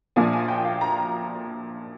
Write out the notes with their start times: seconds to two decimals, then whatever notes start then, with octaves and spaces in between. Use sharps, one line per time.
0.16 A#1 A#2 F3 A#3 D4 G#5
0.33 G#5
0.48 G5
0.65 F5
0.81 A#5